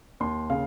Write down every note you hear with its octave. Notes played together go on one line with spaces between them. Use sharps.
D#2 C6
C#3 F5